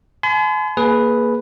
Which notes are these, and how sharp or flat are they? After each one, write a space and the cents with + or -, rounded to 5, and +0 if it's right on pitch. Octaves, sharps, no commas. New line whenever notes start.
G#5 +40 C6 -45
A#3 +0 G#4 +20 B4 +0